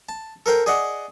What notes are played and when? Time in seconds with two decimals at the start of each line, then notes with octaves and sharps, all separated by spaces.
0.09 A5
0.46 A4 A#4 C5 G5
0.66 G#4 D5 D#5 F#5